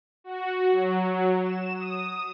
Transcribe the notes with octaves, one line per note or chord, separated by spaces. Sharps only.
F#4
F#3
E7
D#6